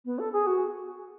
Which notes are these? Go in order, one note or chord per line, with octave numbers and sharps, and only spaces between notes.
B3
A4
G#4
F#4